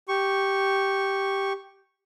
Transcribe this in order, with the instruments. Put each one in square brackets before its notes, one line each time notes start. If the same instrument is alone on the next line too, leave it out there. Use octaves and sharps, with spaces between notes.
[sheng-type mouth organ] G4 C#6